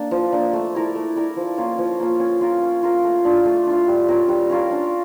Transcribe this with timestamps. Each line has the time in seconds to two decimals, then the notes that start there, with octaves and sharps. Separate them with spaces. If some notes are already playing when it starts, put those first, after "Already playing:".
Already playing: A#3 D4
0.11 F3
0.32 A#3 D4
0.53 A3
0.75 E4 A#4 D5
0.95 A3
1.16 E4 A#4 D5
1.36 F3
1.58 A#3 C#4 F4
1.78 F3
1.99 A#3 C#4 F4
2.20 C#4
2.41 F4 A#4
2.62 C#4
2.83 F4 A#4
3.04 A3
3.25 D4 F4
3.45 A3
3.67 D4 F4
3.88 G3
4.08 C#4 F4 A#4
4.29 G3
4.50 C#4 F4 A#4
4.71 D4